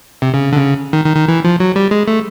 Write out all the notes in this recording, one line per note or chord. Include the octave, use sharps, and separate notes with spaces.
C3
C#3
D3
C#3
D#3
D#3
D#3
E3
F3
F#3
G3
G#3
A3